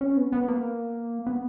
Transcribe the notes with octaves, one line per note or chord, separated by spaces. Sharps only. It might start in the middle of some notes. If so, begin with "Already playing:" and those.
C#4
B3
B3
A#3
B3